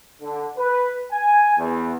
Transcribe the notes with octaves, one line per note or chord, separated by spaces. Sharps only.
D3
B4
G#5
E2